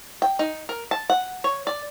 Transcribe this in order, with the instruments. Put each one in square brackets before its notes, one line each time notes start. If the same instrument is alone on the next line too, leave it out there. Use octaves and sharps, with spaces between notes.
[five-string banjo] G5
D#4
A#4
A5
F#5
C#5
D5